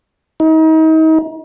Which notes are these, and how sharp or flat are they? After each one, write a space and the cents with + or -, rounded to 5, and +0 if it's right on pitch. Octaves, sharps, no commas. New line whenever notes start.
D#4 +35